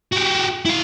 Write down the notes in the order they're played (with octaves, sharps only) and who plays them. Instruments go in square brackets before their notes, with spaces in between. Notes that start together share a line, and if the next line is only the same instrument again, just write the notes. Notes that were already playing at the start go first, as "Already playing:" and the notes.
[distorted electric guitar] F#4 G4
E4 F5